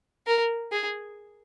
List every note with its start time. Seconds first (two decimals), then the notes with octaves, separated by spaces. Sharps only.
0.27 A#4
0.72 G#4